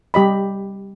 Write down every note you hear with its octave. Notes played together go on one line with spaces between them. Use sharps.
G3 G4 D#5 B5